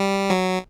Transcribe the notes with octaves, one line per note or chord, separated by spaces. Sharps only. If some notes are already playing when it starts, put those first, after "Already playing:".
Already playing: G3
F#3